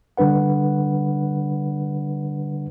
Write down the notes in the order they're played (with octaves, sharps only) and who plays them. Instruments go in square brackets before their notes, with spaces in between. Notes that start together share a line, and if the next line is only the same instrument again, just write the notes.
[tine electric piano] D3 G3 D4 B4 F#5